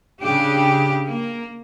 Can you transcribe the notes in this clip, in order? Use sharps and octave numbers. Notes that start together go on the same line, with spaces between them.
C#3 D4 G4
A#3